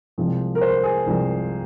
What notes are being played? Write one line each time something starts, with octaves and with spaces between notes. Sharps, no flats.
C2 C3 F3 G#3
A#4
C5
G#4
C2 C3 F3 G#3